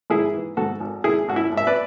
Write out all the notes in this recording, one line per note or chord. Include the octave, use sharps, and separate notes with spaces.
G#2 E4 G#4
E3
G#2 F#4 A4
G#1
G#1 E4 G#4
G#1 F#4
E4
G#1
E5
B4 D5